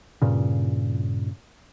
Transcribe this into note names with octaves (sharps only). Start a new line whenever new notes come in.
G2 A#2 C#3